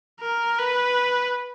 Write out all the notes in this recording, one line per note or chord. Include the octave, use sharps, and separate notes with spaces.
A#4
B4